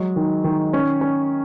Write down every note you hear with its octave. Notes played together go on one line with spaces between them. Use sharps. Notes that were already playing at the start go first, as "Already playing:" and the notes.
Already playing: F#3 G#3
D#3
D#3
C#4
C#4